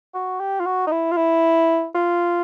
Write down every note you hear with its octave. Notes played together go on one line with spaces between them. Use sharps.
F#4
G4
F4
F#4
D#4
E4
F4
E4
F4